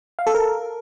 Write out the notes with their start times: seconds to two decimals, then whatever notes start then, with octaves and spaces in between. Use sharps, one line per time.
0.19 F5
0.27 A4
0.35 A#4